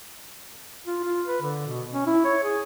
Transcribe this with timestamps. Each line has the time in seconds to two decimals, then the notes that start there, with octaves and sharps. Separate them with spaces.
0.86 F4
1.04 F4
1.26 B4
1.42 D3
1.67 B2
1.93 C#4
2.07 E4
2.25 C#5
2.43 G#4